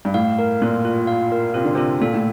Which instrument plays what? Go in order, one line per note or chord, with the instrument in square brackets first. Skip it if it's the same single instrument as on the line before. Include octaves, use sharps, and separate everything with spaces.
[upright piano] G2
[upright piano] A2 [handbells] F5
[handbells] A#4
[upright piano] A#2 [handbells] F4
[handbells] F4
F5
A#4
[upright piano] C3 [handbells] F4
[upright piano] D3
[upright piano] C3 [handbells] F4
[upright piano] A#2 [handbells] A4
[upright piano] A2